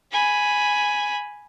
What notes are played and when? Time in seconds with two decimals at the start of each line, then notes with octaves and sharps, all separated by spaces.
0.12 G#5 B5